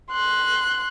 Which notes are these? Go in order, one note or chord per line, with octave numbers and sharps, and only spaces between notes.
C6 F#6